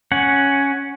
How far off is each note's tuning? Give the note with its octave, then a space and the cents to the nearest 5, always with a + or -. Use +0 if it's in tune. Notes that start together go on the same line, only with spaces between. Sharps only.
C#4 +0 F#5 +0